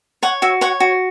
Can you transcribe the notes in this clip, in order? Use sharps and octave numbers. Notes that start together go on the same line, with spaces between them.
C#5 F#5
F#4 E5
C#5 F#5
F#4